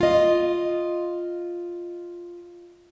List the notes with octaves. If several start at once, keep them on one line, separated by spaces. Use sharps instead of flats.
F4 D#5